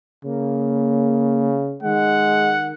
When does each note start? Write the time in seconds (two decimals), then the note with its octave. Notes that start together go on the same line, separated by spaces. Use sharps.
0.24 C#3 A#3
1.83 D#3 G#3 F#5